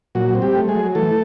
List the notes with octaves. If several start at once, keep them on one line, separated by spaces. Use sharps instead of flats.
A#2 F#3 F#4
C4
G3 G4
A3
G#3 G#4
F#3
E3 A3 A4